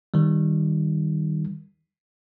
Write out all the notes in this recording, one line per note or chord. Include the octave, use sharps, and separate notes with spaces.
D#3 G3